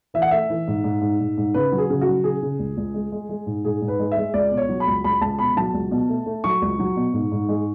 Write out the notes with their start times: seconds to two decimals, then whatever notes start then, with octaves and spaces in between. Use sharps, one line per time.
0.14 E3 E5
0.22 F#5
0.31 A3 E5
0.50 E3
0.68 G#2
0.84 G#2
1.01 G#2
1.20 G#2
1.38 G#2
1.54 C#3 B4
1.72 F#3
1.78 G#4
1.90 C#3
2.01 F#4
2.07 F#3
2.24 C#3 G#4
2.42 C#3
2.59 C#2
2.77 C#2
2.94 G#3
3.12 G#3
3.29 G#3
3.46 G#2
3.65 G#2 G#4
3.81 G#2
3.88 B4
3.99 G#3
4.12 E5
4.17 G#3
4.34 C#2 D5
4.51 B2
4.57 C#5
4.69 F#3
4.80 B5
4.87 C#2
5.04 C#2 B5
5.21 C#2 A5
5.39 B2 B5
5.57 F#3 A5
5.74 C#2
5.91 B2
6.09 A3
6.26 A3
6.44 F#3 C#6
6.62 C#2
6.79 F#3
6.96 B2
7.13 G#2
7.32 G#2
7.49 G#3